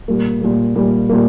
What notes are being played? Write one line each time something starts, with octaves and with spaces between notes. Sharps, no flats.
A#2 G3 A#3
A#2 G3 A#3
A#2 G3 A#3
A#2 G3 A#3